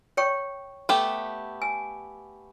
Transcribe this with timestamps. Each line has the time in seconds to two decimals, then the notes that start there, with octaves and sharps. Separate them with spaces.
0.17 C#5 G5 C#6
0.89 A3 B3 G4
1.62 G#5